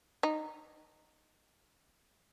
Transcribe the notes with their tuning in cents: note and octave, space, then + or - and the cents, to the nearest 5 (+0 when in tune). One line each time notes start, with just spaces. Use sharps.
D#4 -15